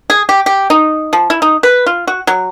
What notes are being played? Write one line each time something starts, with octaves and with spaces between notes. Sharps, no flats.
G#4
G4
G4
D#4
F3
E4
D#4
B4
F4
F#4
F#3